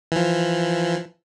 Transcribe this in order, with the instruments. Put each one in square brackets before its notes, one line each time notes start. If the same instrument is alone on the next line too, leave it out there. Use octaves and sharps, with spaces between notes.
[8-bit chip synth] E3 F3